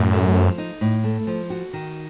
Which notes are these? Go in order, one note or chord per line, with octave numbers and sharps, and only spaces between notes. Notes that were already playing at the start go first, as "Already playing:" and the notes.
Already playing: F#2 A2
A3
F3
D#4
A2
A3
F3
F#4
D#3